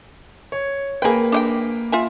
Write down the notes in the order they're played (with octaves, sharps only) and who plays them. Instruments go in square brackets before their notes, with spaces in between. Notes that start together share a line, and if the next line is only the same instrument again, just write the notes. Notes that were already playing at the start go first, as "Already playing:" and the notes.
[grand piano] C#5
[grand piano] A#3 B4 [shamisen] G#4 G5
[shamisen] D4 D#5 G5
F4 E5 G#5